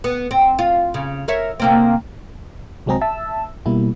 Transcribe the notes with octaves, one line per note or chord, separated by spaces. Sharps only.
B3
C4
F4
C#3
A#4 C#5 E5
C3 A#3 C4
C2 F#3 G#3 C4 G#4 A#5
E5 A5 E6
B2 G3 A#3 E4